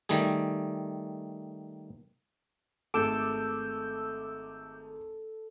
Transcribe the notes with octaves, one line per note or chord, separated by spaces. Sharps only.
D#3 G3 A3 G#4
G#1 A3 G#4 A4 D6 E6 G6